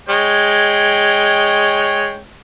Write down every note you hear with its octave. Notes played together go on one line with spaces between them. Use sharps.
G#3 C#5 G5